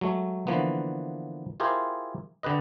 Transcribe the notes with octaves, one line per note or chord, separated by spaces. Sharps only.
F#3 G#3 A3
D3 E3 F3 A#3 B3
E4 F4 G4 G#4 A#4 C5
D3 G4 B4 D#5